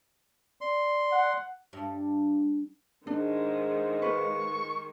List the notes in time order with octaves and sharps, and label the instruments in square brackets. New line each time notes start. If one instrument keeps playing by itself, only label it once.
[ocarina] D5 [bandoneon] C6
[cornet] F#5
[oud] G2
[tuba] G#2 [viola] D#3 G#3 [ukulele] D4
[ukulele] F4 B4 [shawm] C#6